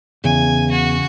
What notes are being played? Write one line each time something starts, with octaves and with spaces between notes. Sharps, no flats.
E2 C#3 G#5
F#4